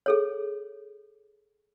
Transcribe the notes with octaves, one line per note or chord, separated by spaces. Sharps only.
G#4 A4 C#5